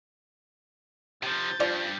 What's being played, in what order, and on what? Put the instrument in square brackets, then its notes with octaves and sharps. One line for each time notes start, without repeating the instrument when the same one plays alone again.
[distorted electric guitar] C3 F3 [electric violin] G6 A6
[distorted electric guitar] G2 [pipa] F3 [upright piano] D5